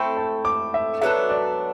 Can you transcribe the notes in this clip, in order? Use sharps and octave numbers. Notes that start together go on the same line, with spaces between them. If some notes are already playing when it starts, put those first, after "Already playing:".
Already playing: A3 C4 E4 A4 G5
A5
D6
E5
F#3 B3 D4 A4 E5
D5